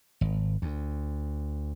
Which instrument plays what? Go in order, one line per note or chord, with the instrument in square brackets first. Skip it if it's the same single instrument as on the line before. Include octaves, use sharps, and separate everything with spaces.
[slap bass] G#1
D2